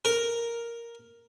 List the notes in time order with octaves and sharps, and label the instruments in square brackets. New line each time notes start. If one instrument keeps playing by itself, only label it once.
[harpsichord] A#4